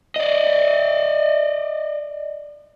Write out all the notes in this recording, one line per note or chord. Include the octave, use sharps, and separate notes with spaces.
D5 D#5